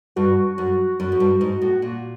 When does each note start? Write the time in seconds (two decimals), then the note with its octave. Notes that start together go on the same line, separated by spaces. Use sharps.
0.16 G2 F#4
0.58 F#2
1.00 F#2
1.12 F#2
1.20 G2
1.41 G#2
1.62 A2
1.82 A#2